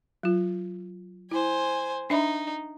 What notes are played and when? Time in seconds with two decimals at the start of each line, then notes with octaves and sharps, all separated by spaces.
0.23 F#3 F4
1.31 E4 C5 G#5
2.10 D4 D#4 E5 B5